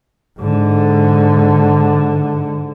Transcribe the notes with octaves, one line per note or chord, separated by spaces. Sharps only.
G#2 D3